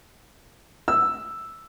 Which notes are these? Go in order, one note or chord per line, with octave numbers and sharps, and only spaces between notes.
E6